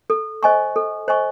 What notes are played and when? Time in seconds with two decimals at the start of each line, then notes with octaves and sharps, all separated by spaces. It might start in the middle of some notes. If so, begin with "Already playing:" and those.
0.10 A4
0.43 C5 D#5 G#5 C#6
0.76 A4
1.08 C5 D#5 G#5 C#6